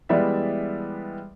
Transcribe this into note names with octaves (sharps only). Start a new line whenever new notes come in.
E3 G3 G#3 B3 D5 E5